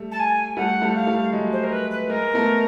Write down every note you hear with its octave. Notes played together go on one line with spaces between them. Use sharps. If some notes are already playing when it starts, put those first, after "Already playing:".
Already playing: G3 A3
A5
G#5
G3 A3 F#5
G3 A3
F5
G3 A3
F#3 G#3
C5
A#4
B4
B4
G#3 A#3 A#4
A3 B3